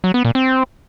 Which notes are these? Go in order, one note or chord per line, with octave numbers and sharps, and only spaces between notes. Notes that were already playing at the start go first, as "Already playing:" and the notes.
F#3
B3
A#2
C4